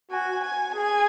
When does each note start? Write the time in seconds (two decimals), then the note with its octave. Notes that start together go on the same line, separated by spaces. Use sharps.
0.11 F#4 G#5
0.43 G#5
0.74 G#4 G#5